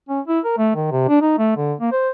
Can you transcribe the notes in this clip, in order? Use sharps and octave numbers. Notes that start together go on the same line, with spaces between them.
C#4
E4
A#4
A3
D#3
C3
D4
D#4
A3
D3
A#3
C5